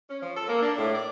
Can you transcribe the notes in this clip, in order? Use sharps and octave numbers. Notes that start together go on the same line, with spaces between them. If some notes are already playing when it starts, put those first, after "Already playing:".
C#4
F3
A4
A#3
D4
A2
D5